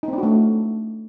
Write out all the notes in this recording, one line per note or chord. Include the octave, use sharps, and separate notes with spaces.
D#4
C4
D4
F#4
A3